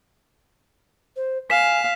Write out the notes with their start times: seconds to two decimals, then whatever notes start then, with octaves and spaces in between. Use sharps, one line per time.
1.16 C5
1.50 F5 G#5 B6 E7